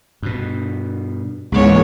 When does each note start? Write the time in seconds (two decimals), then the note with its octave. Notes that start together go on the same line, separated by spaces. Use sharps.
0.23 G2 B2
1.52 C#2 G#2 E3 G#3 A#3 B3 C#5